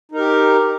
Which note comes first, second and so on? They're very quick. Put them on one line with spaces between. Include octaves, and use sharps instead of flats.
D#4 A#4 G4